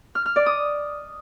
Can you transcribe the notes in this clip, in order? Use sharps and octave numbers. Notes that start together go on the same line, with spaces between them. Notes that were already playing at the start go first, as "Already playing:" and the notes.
F6
F6
D5
D#6